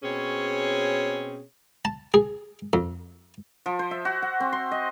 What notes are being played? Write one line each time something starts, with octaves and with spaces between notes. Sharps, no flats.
B2 C4 C#4 G#4 C#5
A5
G#4
F2
F3
C5
E5
F#4
F#5
C4
C6
D#5